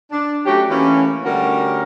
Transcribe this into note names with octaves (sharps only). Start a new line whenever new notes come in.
D4
F#3 A3 C#4 F#4 G4
E3 A3 A#3 C#4
D3 G3 A3 C#4 F#4 A#4